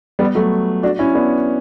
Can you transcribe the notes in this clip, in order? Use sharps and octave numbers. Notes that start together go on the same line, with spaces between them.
G3 B3
F#3 A3
D4 F#4
C#4 E4
B3 D4